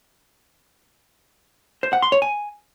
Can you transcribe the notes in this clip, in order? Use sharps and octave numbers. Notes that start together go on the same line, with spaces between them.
C5
F#5
C6
C#5
G#5